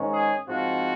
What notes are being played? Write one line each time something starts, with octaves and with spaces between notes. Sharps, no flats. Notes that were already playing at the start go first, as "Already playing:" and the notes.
Already playing: G#2 D#3 G#3 C#4
G#4
G#2 F3 C4 F4 F#4